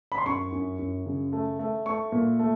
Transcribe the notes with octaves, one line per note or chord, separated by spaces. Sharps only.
B5
C6
F#2 C#6
F#2
F#2
C#3
A3
A3
A3 C#6
A#2
A3